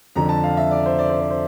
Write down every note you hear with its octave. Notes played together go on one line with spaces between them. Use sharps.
F2 D3 F3 A#5
A5
F5
E5
D5
C5
D5
C5
C5
C5